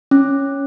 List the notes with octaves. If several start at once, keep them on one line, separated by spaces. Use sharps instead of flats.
C#4